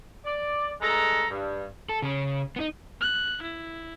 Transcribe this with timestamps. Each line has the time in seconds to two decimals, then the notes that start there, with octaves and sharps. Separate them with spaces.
0.25 D5
0.82 G2 G#3 A4 A#5
1.30 G2
1.89 A4
2.02 C#3 C#4
2.56 B3 D#4
3.01 F#6
3.43 E4